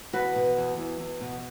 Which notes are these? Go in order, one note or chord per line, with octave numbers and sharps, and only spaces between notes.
E2 F#4 B4
B2
E2
E2
E2
B2